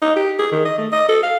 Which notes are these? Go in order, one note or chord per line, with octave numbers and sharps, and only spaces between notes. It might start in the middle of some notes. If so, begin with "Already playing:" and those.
D#4
G4
G#4
D#3
D#5
A3
D#5
A4
F5